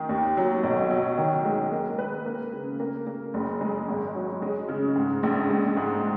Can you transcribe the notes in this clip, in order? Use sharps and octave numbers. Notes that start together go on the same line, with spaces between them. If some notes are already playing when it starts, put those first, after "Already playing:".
Already playing: D#3
D#2
F#3
B1
F#3
D#3
G#3
A#3
B4
A#3
C#3
A#3
A#3
F#1
G#3
G#1
F#3
G#3
C#3
G#2
A#1
G#3
G#2